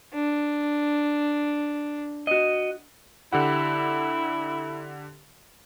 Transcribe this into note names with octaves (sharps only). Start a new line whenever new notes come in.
D4
F#4 D#5
D3 E4 G4 F#5